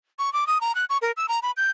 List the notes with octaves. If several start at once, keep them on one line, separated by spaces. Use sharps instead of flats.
C#6
D6
D#6
A#5
F#6
C#6
A#4
E6
A#5
B5
G6